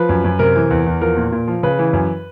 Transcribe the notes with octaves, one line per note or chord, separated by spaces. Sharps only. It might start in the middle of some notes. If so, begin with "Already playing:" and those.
Already playing: F3 B4
F#2
F#2
C3 A#4
E3
E2
E2
F3 A#4
A#2
A#2
F3
C#3 B4
E3
F#2